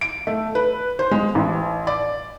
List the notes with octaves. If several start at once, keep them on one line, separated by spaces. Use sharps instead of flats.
D7
A3
B4
C5
G#3
A1
D5